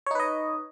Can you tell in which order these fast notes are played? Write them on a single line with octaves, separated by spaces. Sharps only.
C#5 D#4 B4 D#5